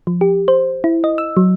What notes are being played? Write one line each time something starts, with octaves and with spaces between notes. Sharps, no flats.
F3
G4
C5
E4
D#5
E6
F#3